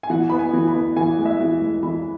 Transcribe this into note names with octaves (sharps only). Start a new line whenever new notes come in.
G#5
E3 F#5
B3 B5
G#5
E3
B5
B3
E3 G#5
G#3
E5
E3
G#3
E3 B5